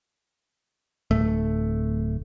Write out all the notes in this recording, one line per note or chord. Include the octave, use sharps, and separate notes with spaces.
D1 A3